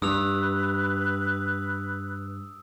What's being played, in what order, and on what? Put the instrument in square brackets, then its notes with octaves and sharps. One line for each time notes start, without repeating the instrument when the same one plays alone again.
[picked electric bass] G2 [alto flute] B4 [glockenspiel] D#6 E6 F7